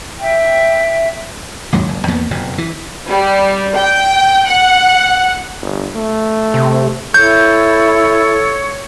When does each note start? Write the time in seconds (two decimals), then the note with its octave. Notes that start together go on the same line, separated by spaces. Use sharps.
0.20 E5 G5
1.72 A#1 D#2 G#2 F#3
1.88 F#1
2.08 E2 A#3 B3
2.31 F#1 F2 B2
2.58 E3
3.09 G3
3.76 G5
4.48 F#5
5.61 G1
5.96 A3
6.54 C3
7.14 E4 A4 C#5 G6